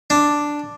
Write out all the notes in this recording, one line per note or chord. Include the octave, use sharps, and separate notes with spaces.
D4